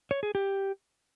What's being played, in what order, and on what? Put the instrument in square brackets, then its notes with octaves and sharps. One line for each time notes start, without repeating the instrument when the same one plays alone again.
[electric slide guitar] C#5
G#4
G4